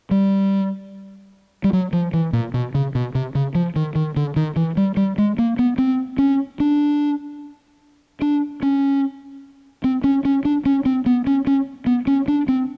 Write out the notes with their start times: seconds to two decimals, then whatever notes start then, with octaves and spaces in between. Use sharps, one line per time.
0.11 G3
1.64 G3
1.73 F#3
1.93 F3
2.14 E3
2.33 A#2
2.54 B2
2.75 C#3
2.95 B2
3.15 C3
3.35 C#3
3.55 F3
3.76 D#3
3.95 D#3
4.16 D3
4.36 D#3
4.56 E3
4.77 G3
4.97 G3
5.18 G#3
5.39 A#3
5.59 B3
5.78 C4
6.18 C#4
6.60 D4
8.22 D4
8.62 C#4
9.84 C4
10.04 C#4
10.25 C#4
10.45 D4
10.66 C#4
10.86 C4
11.06 B3
11.27 C#4
11.47 C#4
11.86 B3
12.07 C#4
12.28 D4
12.48 C4